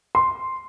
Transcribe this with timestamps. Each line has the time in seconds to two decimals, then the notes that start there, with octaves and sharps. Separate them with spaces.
0.15 C6